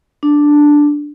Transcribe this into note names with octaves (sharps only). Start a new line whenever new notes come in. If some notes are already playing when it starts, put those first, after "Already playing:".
D4